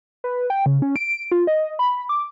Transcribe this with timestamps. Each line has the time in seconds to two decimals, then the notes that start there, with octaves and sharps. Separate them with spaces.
0.24 B4
0.50 G5
0.66 C#3
0.82 C#4
0.96 D7
1.31 F4
1.47 D#5
1.79 B5
2.09 D6